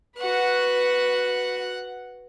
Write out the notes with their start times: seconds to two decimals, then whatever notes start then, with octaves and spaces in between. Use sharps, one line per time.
0.18 F#4 B4 F#5